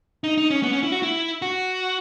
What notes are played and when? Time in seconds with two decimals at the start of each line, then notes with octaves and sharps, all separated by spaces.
0.24 D#4
0.38 D#4
0.51 C#4
0.63 B3
0.72 C#4
0.83 E4
0.92 F#4
1.03 E4
1.42 F#4